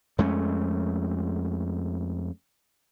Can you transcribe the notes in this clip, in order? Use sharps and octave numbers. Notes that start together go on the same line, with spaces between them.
F2 G#3 A3 C#4